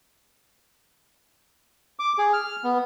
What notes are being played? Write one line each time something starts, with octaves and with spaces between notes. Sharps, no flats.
D6
G#4
F6
B3